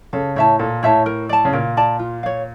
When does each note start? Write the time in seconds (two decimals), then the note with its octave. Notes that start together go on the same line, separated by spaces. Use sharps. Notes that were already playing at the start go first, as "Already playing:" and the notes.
0.13 C#3 A4
0.36 A2 C#5 E5 A5
0.59 A#2 A4
0.83 A2 C#5 E5 A5
1.06 A#4
1.29 D5 A5
1.45 C#3
1.53 A#2 A#4
1.77 D5 A5
1.99 F4
2.23 C#5 F5